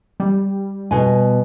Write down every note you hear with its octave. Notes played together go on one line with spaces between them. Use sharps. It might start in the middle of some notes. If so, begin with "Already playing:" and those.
G3
B2 G#5